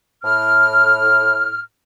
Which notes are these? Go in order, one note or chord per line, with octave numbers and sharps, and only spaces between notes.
A2 F6